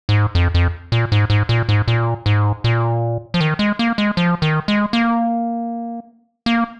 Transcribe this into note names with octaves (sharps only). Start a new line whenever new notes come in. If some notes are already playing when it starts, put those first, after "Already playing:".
G#2
F2
F2
A#2
G#2
G#2
A#2
G#2
A#2
G#2
A#2
F3
D#3
G#3
A#3
G#3
F3
D#3
G#3
A#3
A#3